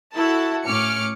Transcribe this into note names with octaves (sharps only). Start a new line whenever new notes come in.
E4 F#4 A4 A5
A2 C#4 D6 F6 C#7